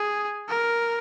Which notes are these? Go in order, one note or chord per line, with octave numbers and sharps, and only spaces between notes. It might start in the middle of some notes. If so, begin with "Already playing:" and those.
Already playing: G#4
A#4